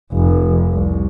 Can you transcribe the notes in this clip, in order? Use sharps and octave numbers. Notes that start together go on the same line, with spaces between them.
F1
C2